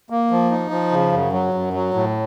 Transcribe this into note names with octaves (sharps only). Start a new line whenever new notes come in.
A#3
F3
D#4
F3
C#3
F#2
F#3
F#2
F#3
A2